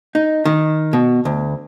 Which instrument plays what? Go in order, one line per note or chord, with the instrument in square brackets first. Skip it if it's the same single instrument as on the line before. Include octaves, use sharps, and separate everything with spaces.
[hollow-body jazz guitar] D#4
D#3
B2
D2